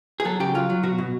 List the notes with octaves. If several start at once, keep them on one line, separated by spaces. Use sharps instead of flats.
G#4
F#3 A4
C#3 G4
F#3 F4
F#3
B2 F#4
B2